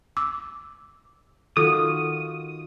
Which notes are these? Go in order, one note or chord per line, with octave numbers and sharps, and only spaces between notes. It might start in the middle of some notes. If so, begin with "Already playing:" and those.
D6 E6
D#3 F4 F#4 A4 D#6